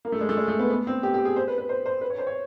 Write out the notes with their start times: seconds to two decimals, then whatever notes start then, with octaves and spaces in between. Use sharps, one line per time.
0.05 A#3
0.12 A3
0.21 G#3
0.29 A3
0.37 G#3
0.48 A3
0.59 B3
0.70 B3
0.87 C4
1.03 G4
1.14 G4
1.25 G#4
1.36 C5
1.48 B4
1.58 B4
1.69 C5
1.86 C5
2.01 B4
2.10 C#5
2.18 C5
2.27 C#5